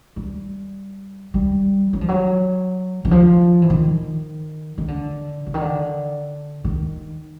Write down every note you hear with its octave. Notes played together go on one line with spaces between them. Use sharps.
G3
G3
F#3
F3
F#3
E3
F3
E3
D#3
D#3
D3
D3
D#3
D3
D#3